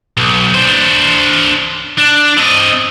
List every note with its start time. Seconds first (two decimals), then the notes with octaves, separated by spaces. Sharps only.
0.17 B1
0.54 D4 C5
1.98 D4
2.37 C4 D#5